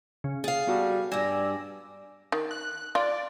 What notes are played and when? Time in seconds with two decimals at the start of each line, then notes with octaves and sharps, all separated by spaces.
0.24 C#3
0.44 G#4 F5 A6
0.67 G3 B3 F#4 A4
1.12 G2 G3 D5 G#5 E6 A#6
2.32 D#3
2.51 F#6
2.95 F4 D5